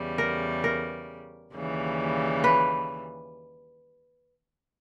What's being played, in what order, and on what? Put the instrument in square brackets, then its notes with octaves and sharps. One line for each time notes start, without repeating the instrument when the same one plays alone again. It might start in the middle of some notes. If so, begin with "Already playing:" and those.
Already playing: [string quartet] E2 C#3 G3
[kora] A#4
A#4
[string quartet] D#2 C#3 E3 G3
[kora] B4